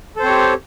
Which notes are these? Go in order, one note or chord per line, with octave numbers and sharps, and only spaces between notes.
C4 G4 A4 C5 C#5